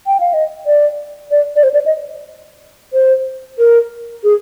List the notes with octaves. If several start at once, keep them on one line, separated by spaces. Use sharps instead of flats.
G5
F5
D#5
D5
D5
D5
C5
D5
D#5
C5
A#4
G#4